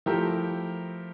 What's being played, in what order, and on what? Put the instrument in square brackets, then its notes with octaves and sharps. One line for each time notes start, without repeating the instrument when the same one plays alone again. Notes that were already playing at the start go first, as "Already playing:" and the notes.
[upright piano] F3 A3 E4 G4 A#4